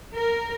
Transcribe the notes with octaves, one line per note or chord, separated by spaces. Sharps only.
A#4